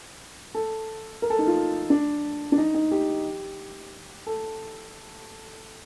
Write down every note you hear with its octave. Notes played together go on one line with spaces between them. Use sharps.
A4
A#4
A4
D#4
F4
D4
D4
D#4
D#4
G4
A4